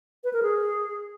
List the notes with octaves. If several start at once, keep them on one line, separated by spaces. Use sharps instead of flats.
B4
A#4
G#4